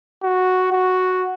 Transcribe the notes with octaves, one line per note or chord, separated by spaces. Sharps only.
F#4
F#4